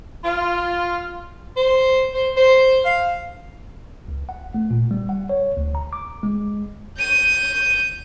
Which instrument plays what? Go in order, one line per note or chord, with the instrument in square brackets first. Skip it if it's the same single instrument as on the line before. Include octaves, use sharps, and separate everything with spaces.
[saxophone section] F4
[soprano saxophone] C5
C5
C5
F5
[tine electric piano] C#2
F#5
A3
A#2
G3
F#5
C#5
D2
A#5
D6
G#3
[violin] G6 D#7